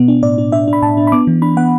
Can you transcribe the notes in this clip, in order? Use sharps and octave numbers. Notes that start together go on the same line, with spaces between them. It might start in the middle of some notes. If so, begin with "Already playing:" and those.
Already playing: B2 B3
D4
A2 D5
D4
D4 E5
D4
B5
A2 A5
D4
B5
B3 D6
E3
D4 B5
B3 F#5